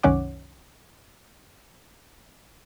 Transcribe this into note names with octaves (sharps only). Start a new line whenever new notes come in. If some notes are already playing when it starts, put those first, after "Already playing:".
C2 F#2 D#3 C#4 F#5 D6